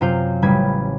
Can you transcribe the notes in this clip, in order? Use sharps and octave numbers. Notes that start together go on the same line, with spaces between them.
F#2 C3 F4 F5 G6
A1 C#3 G3 B5 G#6